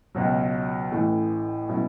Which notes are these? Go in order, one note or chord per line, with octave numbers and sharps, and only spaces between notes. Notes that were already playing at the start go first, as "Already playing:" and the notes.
C#2 B2 F#3
A1 A2 E3
B2 F#3 C#4 E4